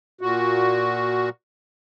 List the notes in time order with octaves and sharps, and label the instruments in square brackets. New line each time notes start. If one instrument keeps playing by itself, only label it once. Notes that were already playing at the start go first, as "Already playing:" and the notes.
[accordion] A#2 F#4